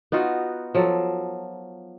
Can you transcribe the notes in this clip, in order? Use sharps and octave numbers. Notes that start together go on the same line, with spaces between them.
B3 D#4 F4 F#4
F3 F#3 A4